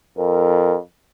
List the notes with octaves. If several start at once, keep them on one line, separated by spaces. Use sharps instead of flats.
F2 A#4